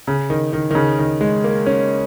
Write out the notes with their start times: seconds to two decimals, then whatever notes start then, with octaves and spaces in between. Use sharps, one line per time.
0.07 C#3
0.30 D#3
0.53 D#3
0.71 D#3
0.75 C#3
0.99 D#3
1.21 G#3
1.44 A#3
1.66 C#4